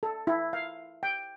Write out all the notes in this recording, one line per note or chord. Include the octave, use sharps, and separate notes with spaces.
A4
E4
F5
G5